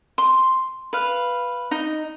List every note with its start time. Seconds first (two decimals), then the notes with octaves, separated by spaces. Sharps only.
0.18 C6
0.93 B4 F5
1.71 D#4